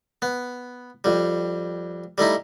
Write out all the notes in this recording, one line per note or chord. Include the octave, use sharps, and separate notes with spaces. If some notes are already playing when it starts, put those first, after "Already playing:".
B3
F2 G3
G3 A3 D#4 E4